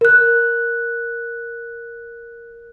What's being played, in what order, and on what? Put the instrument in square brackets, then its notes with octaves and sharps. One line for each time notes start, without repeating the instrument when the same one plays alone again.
[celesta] A#4 F#6